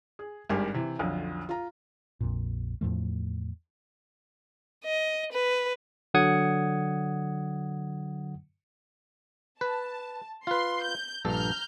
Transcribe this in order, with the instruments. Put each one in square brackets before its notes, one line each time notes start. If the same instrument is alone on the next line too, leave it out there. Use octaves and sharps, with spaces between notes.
[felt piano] G#4
G#1 G2 G4 A#4 G#5
C3 E3
B1 F2 D3
F4 A#5
[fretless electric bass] A#1 F2 A#2
E2 A2 F3 A3
[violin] D#5
B4
[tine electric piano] D3 F#3 F#5 D#6 G#6 C#7
[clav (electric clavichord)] B4 [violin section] A5
[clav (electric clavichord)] F4 B4 [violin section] C6
[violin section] G6
[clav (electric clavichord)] A#1 G2 A4 [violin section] A#5 F6 G6